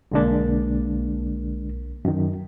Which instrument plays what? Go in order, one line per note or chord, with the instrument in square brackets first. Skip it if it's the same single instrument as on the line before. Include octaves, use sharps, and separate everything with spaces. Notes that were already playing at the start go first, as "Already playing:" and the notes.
[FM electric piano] B1 A#3 [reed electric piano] D3 G#3 D4
[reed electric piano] F#2 D#3